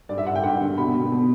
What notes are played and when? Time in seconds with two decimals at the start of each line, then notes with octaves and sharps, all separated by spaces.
0.09 G2 D5
0.18 E5
0.27 G2 F#5
0.35 G5
0.43 G2 F#5
0.61 D3
0.78 B2 B5
0.95 B2
1.12 B2